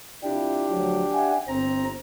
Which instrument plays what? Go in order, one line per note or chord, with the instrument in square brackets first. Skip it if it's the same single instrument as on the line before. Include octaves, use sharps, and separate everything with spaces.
[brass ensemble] C3 E4 F4 [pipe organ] D4 G4
[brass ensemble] D2 F3 F#3
E5 F#5 G#5
[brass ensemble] G1 [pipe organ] C4 A#5